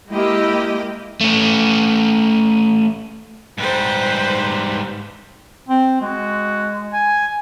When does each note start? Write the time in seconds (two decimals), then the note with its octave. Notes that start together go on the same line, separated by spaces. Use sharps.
0.11 G#3 A#3 E4 G4 D#5
1.21 A3 C#4
3.58 G#2 G3 B4 C5
5.69 C4
6.02 G#3 F#4
6.93 G#5